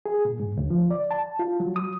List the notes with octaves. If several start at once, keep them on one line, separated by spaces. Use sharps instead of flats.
G#4
A#2
G#2
D2
F3
D5
A5
F4
F#3
D#6